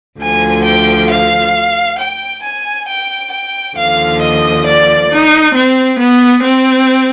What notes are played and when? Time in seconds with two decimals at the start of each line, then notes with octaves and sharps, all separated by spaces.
0.20 D2 D3 F3 G#5
0.65 G5
1.10 F5
1.99 G5
2.43 G#5
2.88 G5
3.32 G5
3.77 D#2 D3 F3 F5
4.21 D#5
4.66 D5
5.10 D#4
5.55 C4
6.00 B3
6.44 C4